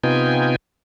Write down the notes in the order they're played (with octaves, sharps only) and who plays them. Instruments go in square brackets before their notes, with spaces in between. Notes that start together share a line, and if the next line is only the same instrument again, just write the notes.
[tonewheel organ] C3 B3 D#4 F4 G5 G#5